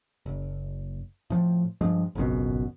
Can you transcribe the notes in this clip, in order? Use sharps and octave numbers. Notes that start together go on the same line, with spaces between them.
F#1
A2 F3
G2 F3 G#3
G#1 C#2 F#2 B2